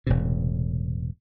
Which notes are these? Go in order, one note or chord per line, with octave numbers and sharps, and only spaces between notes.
E1 A2 C3